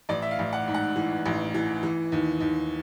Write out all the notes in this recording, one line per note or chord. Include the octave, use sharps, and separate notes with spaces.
A1 D5
E5
F5
A1
F#5
G#2
F#5
E3
A1
E3
E3
D#2
D#2